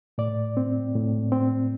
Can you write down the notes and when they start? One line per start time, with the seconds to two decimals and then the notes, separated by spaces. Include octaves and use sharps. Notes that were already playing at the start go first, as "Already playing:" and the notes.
0.18 A2 D5
0.57 C4
0.95 A2
1.32 C4